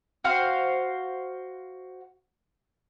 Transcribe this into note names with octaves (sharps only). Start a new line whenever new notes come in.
F#4 C5 F5